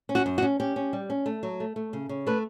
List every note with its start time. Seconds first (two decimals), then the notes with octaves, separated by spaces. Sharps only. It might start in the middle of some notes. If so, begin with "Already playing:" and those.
0.09 C#4
0.15 F#4
0.26 F#2
0.38 F#4
0.42 C#4
0.60 C#4 G4
0.76 C#4
0.93 G3
1.10 C#4
1.26 A3
1.43 F#3
1.60 A3
1.76 A3
1.93 C#3
2.09 C#3
2.26 A3 B4